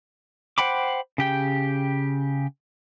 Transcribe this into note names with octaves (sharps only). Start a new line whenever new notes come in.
C5 F#5 G5 B5 D6
C#3 G4 G5